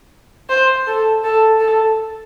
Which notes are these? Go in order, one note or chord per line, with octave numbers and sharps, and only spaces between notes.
C5
A4
A4
A4